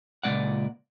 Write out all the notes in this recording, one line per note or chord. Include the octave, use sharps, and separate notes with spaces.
C#2 A#2 C#3 A#3 D5 F#5